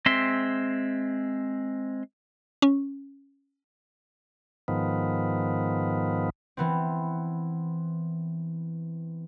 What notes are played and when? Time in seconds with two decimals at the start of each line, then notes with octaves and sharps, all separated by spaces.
0.06 G#3 C4 E5 C6
2.62 C#4
4.68 G#2 D#3 F3 B3
6.57 E3 B3 C4